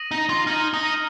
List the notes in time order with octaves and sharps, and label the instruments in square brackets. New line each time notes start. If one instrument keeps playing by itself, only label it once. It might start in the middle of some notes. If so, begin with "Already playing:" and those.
Already playing: [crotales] D#6 A#6 D#7 F#7
[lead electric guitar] D#4
F4
[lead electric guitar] D#4 [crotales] F6 G#6 D#7 F#7
[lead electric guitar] D#4